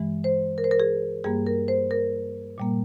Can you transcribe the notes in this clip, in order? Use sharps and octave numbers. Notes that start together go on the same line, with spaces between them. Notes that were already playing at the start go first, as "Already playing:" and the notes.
Already playing: G2 E3 G#3
C5
A#4
C5
A#4
G#4
G2 G3 A#3 G#4
A#4
C5
A#4
A#2 G3 A#3